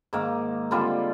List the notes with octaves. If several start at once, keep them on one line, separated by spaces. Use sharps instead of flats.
G#2 D#3 A#3
D3 G3 C4 F4